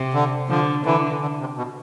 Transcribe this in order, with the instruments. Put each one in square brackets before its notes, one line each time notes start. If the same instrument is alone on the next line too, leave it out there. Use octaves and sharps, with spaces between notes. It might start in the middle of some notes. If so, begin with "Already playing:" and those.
Already playing: [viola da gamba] C3
[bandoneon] D3
[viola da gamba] D3 [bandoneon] F3
[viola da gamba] D3 [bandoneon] E3
[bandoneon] D3
C3
B2